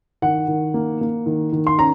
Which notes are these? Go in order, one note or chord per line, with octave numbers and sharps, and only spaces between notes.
D#3 F#5
D#3
A#3
A#3
D#3
D#3
C6
C#4 A#5